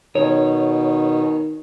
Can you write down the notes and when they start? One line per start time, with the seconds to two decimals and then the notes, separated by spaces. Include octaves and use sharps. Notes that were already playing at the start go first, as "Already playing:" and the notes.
0.15 B2 D#3 C#5